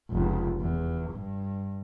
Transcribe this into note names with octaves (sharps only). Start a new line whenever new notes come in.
F1 C#2
E2
G2